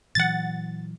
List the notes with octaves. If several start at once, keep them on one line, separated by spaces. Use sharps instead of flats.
A#2 E3 F#3 F#5 A6